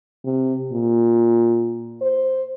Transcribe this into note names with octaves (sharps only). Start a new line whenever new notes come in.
C3
A#2
C5